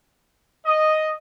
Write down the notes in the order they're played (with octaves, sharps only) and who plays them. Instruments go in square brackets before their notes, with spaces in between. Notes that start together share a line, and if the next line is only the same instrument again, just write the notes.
[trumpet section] D#5